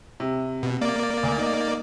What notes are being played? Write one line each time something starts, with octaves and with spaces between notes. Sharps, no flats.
C3
B2
A#3 D5
D2 G#5
D#4